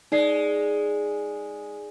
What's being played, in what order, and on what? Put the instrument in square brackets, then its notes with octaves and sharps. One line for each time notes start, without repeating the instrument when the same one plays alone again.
[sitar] G#3 [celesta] D#4 D5 C7